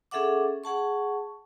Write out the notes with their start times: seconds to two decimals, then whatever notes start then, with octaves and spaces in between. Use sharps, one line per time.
0.11 C#4 G#4 A4 E5 F#5 D6
0.64 G#4 F#5 A5 C#6